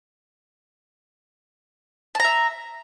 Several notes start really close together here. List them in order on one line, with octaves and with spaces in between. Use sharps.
A5 A#5 E5